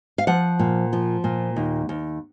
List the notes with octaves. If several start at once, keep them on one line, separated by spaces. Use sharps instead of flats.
F5
F3 F#5
A#2
F3
A#2
D#2
D#2